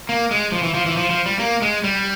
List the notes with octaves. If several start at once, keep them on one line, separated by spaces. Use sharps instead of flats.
A#3
G#3
F3
E3
F3
E3
F3
F3
G3
A#3
G#3
G3